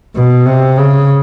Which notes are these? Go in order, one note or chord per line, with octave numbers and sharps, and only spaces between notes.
B2
C3
C#3